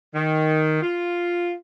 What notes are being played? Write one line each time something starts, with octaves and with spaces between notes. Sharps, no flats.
D#3
F4